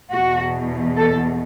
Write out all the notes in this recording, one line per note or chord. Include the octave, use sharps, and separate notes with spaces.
E2 B2 F#4
A4